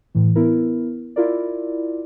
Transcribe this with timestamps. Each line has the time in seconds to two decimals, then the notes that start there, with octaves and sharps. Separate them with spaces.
0.15 A2 E3
0.36 B3 E4 A#4
1.16 E4 F4 A#4 D5